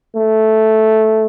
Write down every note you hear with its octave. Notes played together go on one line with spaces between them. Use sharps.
A3